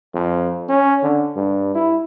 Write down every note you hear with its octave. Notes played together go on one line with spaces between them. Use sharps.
F2
C#4
D3
G2
E4